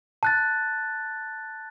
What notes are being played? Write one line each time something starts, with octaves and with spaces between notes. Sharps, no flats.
A5 F#6 A6